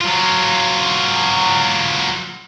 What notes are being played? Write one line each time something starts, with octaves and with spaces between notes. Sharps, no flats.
F#3 F4